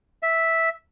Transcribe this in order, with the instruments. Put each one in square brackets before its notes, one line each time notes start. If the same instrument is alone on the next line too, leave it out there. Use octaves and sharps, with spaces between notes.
[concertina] E5